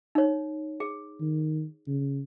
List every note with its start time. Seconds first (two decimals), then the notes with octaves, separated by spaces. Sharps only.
0.15 D#4 C#5
0.80 G#4
1.20 D#3
1.87 C#3